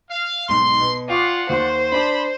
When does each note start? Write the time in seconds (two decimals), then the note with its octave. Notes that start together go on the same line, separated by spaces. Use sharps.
0.11 F5
0.49 B1 G#2 C6
0.80 B2
1.09 F4 D5 F#5 G5 C#6 D6
1.49 D#2 F#4 C5 C6
1.92 D4 D5 A5 B5